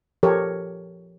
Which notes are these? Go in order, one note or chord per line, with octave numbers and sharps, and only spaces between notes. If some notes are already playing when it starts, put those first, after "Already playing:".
F3 G4 A4 A#4 C#5